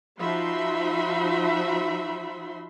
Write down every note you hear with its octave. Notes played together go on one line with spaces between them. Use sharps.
F3 D#4 F#4 E5 B5 C6